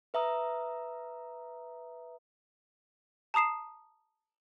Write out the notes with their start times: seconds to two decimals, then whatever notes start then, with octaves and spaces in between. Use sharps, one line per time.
0.14 B4 E5 A#5 D#6
3.34 A5 A#5 D#6 C7 E7